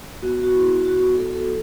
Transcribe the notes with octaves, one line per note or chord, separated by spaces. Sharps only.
B3 F#4
F#4
E4
B3 F#4
F#4
F#4 A4
A4
F#3